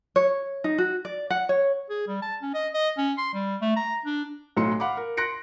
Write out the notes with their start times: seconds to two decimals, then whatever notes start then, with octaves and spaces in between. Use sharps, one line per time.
0.16 C#5
0.64 D#4
0.78 F#4
1.05 D5
1.30 F#5
1.49 C#5
1.90 G#4
2.08 G3
2.22 A5
2.42 C#4
2.54 D#5
2.74 D#5
2.98 C#4
3.18 C6
3.34 G3
3.61 A3
3.76 A#5
4.05 D4
4.56 B1 A2 F#3 C6 C#7
4.80 F5 F#5 B5 D6
4.97 A#4
5.17 C6 F#6 A#6 C#7 D7